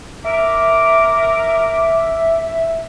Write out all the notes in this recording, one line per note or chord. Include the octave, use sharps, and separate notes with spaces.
A#4 E5 D6